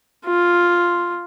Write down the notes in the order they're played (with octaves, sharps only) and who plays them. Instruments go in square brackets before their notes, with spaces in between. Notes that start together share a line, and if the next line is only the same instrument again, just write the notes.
[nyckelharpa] F4